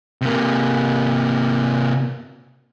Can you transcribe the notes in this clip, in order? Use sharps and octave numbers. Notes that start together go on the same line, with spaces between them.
C3 A#3